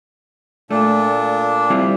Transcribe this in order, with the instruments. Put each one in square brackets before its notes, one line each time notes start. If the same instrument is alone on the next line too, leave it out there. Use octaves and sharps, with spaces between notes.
[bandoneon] A#2 D4 [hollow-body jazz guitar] A3
[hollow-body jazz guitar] G3 C4 E4